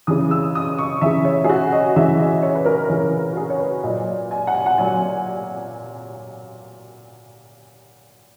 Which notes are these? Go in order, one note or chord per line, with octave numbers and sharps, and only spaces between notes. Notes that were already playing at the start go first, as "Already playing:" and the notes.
C#3 E3 D#6
E6
D#6
C#6
C#3 E3 E5
C#5
G#4
F#4
D#5
C#3 E3 E5
D#5
C#5
B4
A#4
C#3 E3 G#4
G#4
F#4
G#4
C#5
B4
A#2 F#3 D#5
G#5
F#5
G#5
F#5
A#2 F#3 G#5